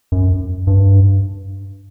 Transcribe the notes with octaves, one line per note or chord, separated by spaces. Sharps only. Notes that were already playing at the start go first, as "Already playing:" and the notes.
F#2
G2